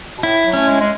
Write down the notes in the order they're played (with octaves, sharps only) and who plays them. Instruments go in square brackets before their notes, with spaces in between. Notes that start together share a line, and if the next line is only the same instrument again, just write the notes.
[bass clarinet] B2
[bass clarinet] A2 [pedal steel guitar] E4
[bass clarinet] F#3
[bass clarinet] A3 [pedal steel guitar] C#4
[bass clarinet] G#3
G#3